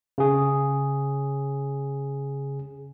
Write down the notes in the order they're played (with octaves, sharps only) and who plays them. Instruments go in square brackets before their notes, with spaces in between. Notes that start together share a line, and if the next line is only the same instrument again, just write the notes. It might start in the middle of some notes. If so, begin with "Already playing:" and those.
[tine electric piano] C#3 G#4